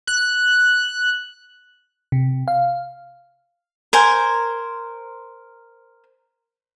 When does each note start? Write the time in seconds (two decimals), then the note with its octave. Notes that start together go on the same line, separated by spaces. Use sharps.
0.07 F#6
2.12 C3
2.48 F5
3.93 A#4 C5 G#5